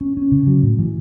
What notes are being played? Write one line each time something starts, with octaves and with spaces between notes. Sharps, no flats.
C#4
C#4
C#3
F#3
A2
E3